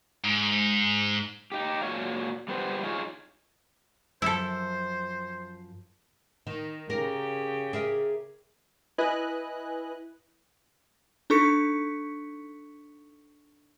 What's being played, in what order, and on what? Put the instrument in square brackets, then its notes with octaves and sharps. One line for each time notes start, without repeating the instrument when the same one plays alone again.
[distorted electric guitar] G#2
[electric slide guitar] D#4 G4
A#2 F#4 C#5 F5
G3 B3 C5
D#4 F4 G#4 C#5
[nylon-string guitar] F#2 F3 [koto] E4 A4 [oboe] C5
[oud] D#3
[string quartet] C#3 G4 [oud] A#4
[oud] G#4 A#4 E5
[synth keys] E4 B4 D#5 G#5 F#6
[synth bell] D4 D#4 A4 C#6 B6 C#7